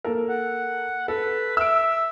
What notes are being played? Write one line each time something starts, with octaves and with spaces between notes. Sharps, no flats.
A#3 A4 A#4
F#5
A4 B4
E5 E6 D7